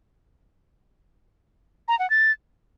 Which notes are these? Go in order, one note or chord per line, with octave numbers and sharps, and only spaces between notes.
A#5
F#5
A6